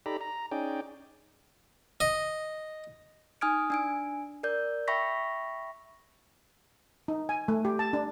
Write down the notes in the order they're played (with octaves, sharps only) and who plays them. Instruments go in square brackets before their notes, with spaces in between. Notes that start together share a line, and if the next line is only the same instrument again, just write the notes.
[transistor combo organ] D#4 G4 A4 D5 A#5 B5
A#5
C#4 D#4 G#4 D5 G5
[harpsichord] D#5
[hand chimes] D#4 G#5 D#6 F6 G#6 D7
D4 G#5 D7
A#4 D5 G6
E5 G5 B5 C#6 A#6 B6
[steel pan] D#4
G#5
A3
G4
A5
D4